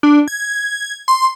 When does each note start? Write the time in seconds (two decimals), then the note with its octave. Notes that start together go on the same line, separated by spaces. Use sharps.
0.03 D4
0.28 G#6
1.08 C6